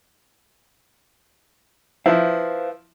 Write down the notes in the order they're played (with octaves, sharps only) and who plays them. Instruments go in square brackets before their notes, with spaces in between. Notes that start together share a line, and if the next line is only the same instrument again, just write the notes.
[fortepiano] F3 E4 [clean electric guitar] B4 C5 F5